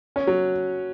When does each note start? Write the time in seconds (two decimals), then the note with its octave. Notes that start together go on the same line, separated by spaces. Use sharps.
0.16 C#4
0.27 F#3